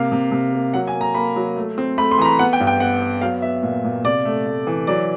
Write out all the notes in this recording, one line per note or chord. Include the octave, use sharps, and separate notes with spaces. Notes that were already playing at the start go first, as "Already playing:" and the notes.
Already playing: C3 A#3 F5
C3
C3
A#3
F#3 F#5
G#5
A#3
A#5
A#3 B5
F#3
A3
C4
A3 B5
C6
E3 A#5
B5
B3 F#5
G5
G2
G5
B3 F#5
B3
F#3 F5
B3 E5
A#2
A#2
C3 D5
A3
A3
E3
F#3 D5